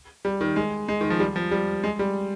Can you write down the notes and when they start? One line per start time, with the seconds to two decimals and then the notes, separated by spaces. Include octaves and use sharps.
0.25 G3
0.41 D#3
0.56 G#3
0.88 G#3
1.01 D#3
1.10 F3
1.20 G3
1.36 F3
1.51 G3
1.84 G#3
1.99 G3